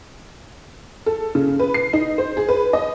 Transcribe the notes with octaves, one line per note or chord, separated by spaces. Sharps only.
A4
C#3
B4
C7
D#4
C5
G#4
B4
D#5